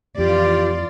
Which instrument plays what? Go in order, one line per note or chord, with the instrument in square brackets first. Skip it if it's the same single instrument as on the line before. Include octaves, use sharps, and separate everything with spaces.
[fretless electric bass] F2 [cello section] E3 F4 D5 [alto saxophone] G4